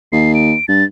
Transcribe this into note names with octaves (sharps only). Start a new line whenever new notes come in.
D#2 C7
D7
G2 A6